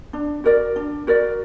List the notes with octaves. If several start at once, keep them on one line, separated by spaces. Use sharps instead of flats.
D4
F#4 A#4 D5
D4
F#4 A#4 D5